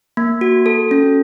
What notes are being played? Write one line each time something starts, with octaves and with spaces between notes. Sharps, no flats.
A#3
F#4
A4
C#4